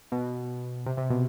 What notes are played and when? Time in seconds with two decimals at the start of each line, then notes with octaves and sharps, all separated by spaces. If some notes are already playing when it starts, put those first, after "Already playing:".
0.12 B2
0.86 C3
0.97 C3
1.10 B2